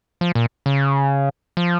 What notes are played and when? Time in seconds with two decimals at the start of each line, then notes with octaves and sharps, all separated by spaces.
0.21 F3
0.35 A#2
0.66 C#3
1.57 F3